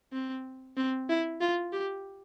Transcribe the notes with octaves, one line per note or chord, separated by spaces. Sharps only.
C4
C4
E4
F4
G4